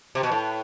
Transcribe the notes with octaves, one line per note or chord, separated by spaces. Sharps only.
C3
B2
A2